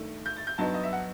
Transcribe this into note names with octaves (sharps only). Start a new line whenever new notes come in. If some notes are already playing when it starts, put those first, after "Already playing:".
Already playing: G2 D#3 A3
G6
A6
G6
G2 F#3 B3 D#4 A5
D#5
E5
F#5